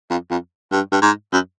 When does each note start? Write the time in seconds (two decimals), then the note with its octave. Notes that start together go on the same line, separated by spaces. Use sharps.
0.10 F2
0.31 F2
0.71 G2
0.92 G2
1.02 G#2
1.32 F#2